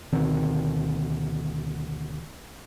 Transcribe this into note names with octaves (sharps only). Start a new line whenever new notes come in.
D2 B2 D#3 C4